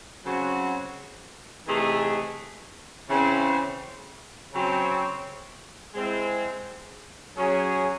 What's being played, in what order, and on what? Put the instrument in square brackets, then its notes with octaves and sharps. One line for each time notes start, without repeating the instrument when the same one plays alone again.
[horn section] C#3 F#3 C4 F#4
C3 E3 A3 D#4 G#4
C#3 E3 C4
C#3 F#3 C4
G#3 C4 E4
F#3 C#4 G#4